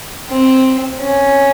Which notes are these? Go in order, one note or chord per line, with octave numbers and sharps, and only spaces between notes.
C4
C#4